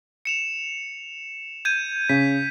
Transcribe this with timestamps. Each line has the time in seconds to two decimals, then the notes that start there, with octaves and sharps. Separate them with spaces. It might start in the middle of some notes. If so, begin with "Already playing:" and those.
0.25 C#7 E7 F7
1.65 G6 G#6 D#7
2.09 C#3 B6